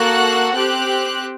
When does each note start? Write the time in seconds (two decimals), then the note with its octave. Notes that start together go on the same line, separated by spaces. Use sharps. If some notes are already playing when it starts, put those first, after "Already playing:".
Already playing: A#3 F#4 A4 F#6
0.54 C4 G4 F#6